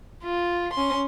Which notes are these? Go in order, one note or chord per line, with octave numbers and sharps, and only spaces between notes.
F4
C#4 C6